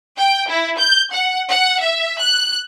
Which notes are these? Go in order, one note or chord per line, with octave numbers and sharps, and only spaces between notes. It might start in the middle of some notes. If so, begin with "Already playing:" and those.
G5
E4
G6
F#5
F#5
E5
F#6